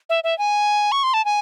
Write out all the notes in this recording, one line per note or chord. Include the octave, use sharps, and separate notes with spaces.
E5
E5
G#5
C#6
C6
A5
G#5